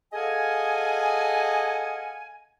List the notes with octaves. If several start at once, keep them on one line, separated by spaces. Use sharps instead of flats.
G#4 A4 D#5 F5 F#5 G#5